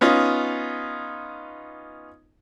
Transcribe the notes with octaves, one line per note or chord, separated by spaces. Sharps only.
B3 C#4 D#4 F4